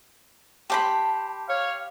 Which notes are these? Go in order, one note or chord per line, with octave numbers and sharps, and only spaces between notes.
G4 C5 A5 B5
C#5 F5 F6